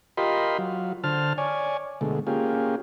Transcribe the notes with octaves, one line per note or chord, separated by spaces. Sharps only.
F4 G4 A#4 D#5 B5 C6
F#3 F4
D3 C5 A5 F6
C#5 D5 G#5
B2 D3 G#3 A3
A#3 C#4 F4 G4 G#4